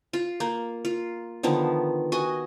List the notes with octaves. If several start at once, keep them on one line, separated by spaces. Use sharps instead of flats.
F4
A#3
F4
D3 D#3 F3 B3
F#4 D#5 G#5